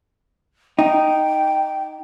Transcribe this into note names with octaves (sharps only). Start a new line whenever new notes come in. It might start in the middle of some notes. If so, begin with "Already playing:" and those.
D#4 G5